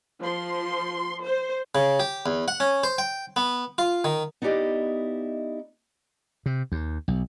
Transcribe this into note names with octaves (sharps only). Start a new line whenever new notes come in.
F3 C6
C5
C#3
G4
E2
F#5
C#4
C5
G5
B3
F4
D#3
B3 D#4 E4 G4 D5 D#5
C3
D#2
B1